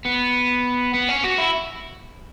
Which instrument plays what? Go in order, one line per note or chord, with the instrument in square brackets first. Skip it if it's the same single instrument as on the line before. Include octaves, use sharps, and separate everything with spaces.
[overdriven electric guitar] B3
B3
C#4
F#4
E4